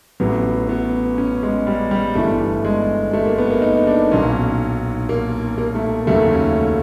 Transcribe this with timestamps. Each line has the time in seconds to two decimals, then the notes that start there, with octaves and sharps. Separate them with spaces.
0.20 A1 A2 F#3 B3
0.69 B3
1.18 C#4
1.43 G#3
1.67 G3
1.91 G3
2.15 G1 G2 E3 A3
2.65 G#3
3.13 A3
3.25 A#3
3.38 B3
3.50 A#3
3.62 D#4
3.87 D4
4.11 B1 A#2 F#3 C#4
5.09 A#3
5.58 A#3
5.75 A3
6.07 F1 D#2 C#3 F#3 A3
6.31 C#4